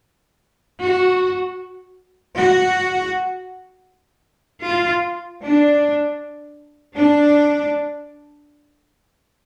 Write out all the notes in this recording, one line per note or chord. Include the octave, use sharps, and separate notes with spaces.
F#4
F#4
F4
D4
D4